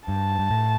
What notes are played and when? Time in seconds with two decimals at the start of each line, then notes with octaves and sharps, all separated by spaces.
0.08 G2 A5
0.39 G2
0.51 A2